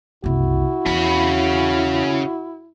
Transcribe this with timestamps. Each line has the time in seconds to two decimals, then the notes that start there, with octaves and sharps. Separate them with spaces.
0.24 F#1 C2 E4 F#4
0.86 E2 C#3 B5